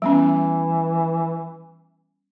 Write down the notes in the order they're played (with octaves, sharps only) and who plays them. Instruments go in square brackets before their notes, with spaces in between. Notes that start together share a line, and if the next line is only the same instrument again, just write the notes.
[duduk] E3 [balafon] G3 B3 C#4